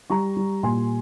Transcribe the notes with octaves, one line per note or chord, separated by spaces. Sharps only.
G3 A#5 C#6
G3
A#2 G#5 C6